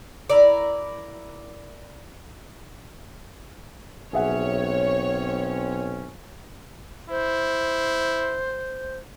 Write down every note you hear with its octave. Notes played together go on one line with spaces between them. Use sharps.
E4 A#4 D5
B1 C4 C#4 G#4 C#5 E5 F#5
E4 C5